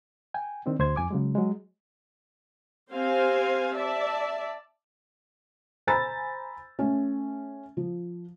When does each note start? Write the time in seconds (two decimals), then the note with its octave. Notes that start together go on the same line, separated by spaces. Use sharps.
0.34 G5 G#5
0.66 D#3 C4 D4
0.79 D2 C5 C6 G#6
0.96 F2 G#5 D6
1.10 C#3 F#3 G#3
1.35 F#3 G#3
2.91 C4 G4 C5 F5 G#5
3.76 D5 E5 A5
5.87 C5 G#5 A#5 B5 E6 A6
6.79 A3 C#4
7.77 F3